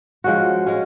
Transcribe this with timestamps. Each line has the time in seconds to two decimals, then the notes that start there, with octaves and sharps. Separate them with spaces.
0.24 F3 G#3 C#4 F#4
0.66 G#3 C#4